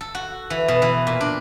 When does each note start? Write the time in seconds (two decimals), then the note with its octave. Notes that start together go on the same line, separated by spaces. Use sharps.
0.01 A4
0.15 F#4
0.50 E3
0.68 B2
0.82 E3
1.07 A#2
1.21 D4